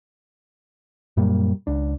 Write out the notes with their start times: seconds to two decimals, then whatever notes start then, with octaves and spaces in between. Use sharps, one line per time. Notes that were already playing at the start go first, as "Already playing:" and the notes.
1.17 F#2 A#2 G3 A#3
1.67 C#2 D4